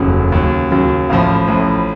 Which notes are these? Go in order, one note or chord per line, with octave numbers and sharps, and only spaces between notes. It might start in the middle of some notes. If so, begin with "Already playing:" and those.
Already playing: F1 D#2 C#3 F#3
D#2 C#3 F#3
D#2 C#3 F#3
A1 A2 F3 F5
A1 A2 F3